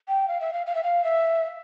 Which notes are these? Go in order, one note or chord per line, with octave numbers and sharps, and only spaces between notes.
G5
F5
E5
F5
F5
E5
F5
E5